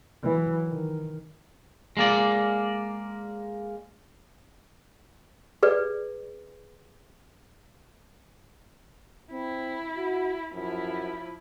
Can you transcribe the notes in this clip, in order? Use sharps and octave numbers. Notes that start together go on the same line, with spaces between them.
E3 F#3
D#3
G#3 A#3 D5
G#4 B4 D5
C4 E4
F#4
F#2 F3 E4